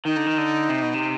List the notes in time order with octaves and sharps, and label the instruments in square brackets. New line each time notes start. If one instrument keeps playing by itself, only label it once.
[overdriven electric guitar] D#3 [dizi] D#4
[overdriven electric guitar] D3
D#3
D3
C3
B2
C3